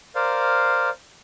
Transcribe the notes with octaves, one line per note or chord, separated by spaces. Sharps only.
A#4 C5 D5 F5